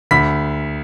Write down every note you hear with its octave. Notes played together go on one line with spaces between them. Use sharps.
D2 B5 B6